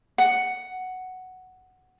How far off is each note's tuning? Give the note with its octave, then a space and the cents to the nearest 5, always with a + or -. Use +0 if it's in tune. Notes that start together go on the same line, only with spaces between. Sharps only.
F#5 +5